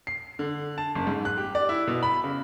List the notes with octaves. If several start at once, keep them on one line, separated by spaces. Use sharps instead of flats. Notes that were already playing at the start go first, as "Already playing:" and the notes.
C7
D3
A5
F#1
G#2
F#6
G4
D5
E4
B2
B5
C#3